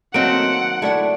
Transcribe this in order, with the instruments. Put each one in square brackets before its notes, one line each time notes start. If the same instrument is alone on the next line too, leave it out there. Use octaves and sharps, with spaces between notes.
[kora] D#3 F#3 A#3 [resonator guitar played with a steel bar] A3 C4 [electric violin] F#5 [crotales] D7
[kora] A3 D4 [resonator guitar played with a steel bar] E4 F#5